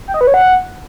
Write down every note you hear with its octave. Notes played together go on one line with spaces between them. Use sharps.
G5
D#5
B4
C#5
F#5